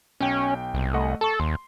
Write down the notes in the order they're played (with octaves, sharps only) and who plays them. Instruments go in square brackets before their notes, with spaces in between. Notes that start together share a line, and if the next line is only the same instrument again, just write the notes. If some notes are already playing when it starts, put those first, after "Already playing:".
[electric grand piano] B1 G5 [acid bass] C#4
[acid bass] C2
[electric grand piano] A3 D#5 F#5
[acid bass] A4 [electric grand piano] A5 C#6
[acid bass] D#2 [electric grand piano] C6